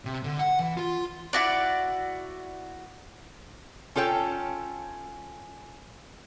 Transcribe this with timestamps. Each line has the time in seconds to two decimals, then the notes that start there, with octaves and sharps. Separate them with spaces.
0.05 C3
0.23 D3
0.39 F#5
0.59 E3
0.77 F4
1.33 E4 F#4 D5
3.95 C#4 F4 A4 C#5 G5